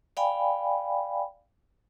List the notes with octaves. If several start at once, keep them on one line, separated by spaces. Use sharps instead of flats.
D5 F5 G5 G#5 B5